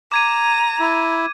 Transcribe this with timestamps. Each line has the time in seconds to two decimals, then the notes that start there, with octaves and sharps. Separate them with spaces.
0.12 A#5 D6 G#6 D#7
0.80 E4